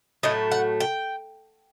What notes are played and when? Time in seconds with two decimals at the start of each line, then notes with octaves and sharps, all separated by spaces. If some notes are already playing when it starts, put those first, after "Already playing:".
0.23 A2 F#3 A3 D#5
0.51 F#5
0.80 G5